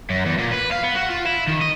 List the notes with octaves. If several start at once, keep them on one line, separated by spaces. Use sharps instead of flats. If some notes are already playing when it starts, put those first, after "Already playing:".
F#2
E2
A#2
B4
F5
B3
F#4
F4
E4
D#3
D#5